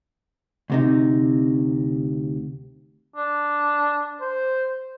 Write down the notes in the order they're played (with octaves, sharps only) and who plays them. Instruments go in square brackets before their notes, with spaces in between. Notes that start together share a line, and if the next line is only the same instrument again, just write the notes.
[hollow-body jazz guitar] D2 C3 D#4
[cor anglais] D4
C5